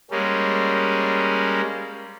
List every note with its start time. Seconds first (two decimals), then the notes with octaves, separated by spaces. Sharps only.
0.11 G3 G#3 A#3 C#4